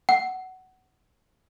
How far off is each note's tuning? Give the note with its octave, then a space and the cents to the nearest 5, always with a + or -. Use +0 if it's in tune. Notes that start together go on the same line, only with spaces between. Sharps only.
F#5 +15